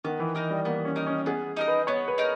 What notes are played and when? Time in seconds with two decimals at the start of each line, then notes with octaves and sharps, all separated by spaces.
0.04 D#3 B3
0.20 E3
0.34 E3 D#4 A#4 D#5
0.50 G3
0.65 A#3 B3
0.85 C#4
0.96 D#4 A#4 D#5
1.07 C#4
1.26 B3 G#4
1.57 D#4 A#4 D#5
1.68 B4
1.87 B3 C#5
2.08 B4
2.18 D#4 A#4